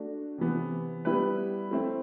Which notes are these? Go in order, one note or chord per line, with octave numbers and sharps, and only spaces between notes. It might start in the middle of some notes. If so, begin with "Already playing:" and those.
Already playing: A3 D4 F#4
C3 E3 B3
G3 B3 E4 G4 B4
A3 C4 E4